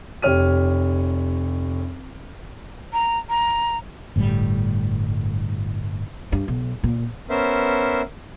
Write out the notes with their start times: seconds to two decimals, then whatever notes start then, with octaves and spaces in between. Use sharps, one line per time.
0.22 F1 G4 C#5 F6 D#7
2.93 A#5
3.29 A#5
4.16 G1 A2 C3 G3
6.32 G2
6.48 B1
6.84 A#2
7.29 B3 C#4 A#4 C5 E5